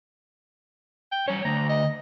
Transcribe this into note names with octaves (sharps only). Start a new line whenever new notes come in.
G5
G3 C#4 C#5
D3 A3 A#5
D#5